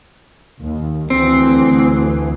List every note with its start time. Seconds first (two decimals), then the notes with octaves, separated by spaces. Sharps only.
0.60 D#2
1.10 D2 E3 C4